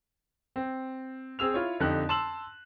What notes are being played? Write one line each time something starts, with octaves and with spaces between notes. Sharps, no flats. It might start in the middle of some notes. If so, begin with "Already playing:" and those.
C4
C4 G#4 E6 F7
E4 F4 C#5
F2 D3 D#4 G4 F#6
A5 C6 E6 E7 F#7